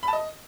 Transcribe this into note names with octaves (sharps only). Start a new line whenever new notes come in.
B5
A5
D#5